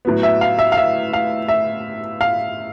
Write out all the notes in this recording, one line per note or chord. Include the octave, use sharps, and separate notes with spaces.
A2 F#3 B3
E5
F5
E5
F5
E5
F5
E5
F5